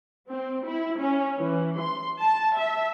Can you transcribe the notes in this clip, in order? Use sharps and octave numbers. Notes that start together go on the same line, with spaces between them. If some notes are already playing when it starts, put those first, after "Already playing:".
C4
E4
C#4
E3
C6
A5
E5